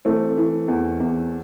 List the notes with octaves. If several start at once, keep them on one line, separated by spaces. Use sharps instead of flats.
E3 A3 C4
E3
E2
E2